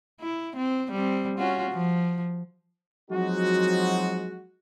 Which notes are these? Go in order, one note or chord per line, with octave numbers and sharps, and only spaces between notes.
E4
C4
G3 C4
C#4 F4 F#4
F3
F3 F#3 G#3 C4 D#4 F#4